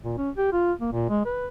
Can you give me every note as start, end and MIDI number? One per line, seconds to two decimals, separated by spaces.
0.04 0.17 46
0.18 0.30 61
0.38 0.49 67
0.53 0.73 65
0.81 0.91 58
0.93 1.06 46
1.10 1.22 56
1.26 1.48 71